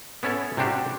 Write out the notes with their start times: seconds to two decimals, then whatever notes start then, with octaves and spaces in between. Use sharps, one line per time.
0.23 B3 C#4 E4 A4 C#5
0.57 C3 G3 C4 D4 F#4 G4